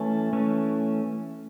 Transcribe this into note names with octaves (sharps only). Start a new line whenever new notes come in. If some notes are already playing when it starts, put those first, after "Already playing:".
Already playing: E3 A3 C#4 A5
E3 A3 C#4